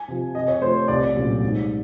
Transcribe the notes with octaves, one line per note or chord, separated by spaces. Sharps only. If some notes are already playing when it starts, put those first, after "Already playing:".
Already playing: G#5
C3 F3
C3 D#5
C#5
F3 A3 C5
C2 D5
A#2 F#3 A3 C#4
G#2